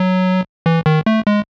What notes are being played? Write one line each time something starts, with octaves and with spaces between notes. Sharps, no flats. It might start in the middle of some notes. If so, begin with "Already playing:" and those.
Already playing: F#3
E3
D#3
A3
G#3